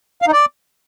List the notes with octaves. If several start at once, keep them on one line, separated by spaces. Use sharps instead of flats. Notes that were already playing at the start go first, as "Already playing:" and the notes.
F5
D#4
D5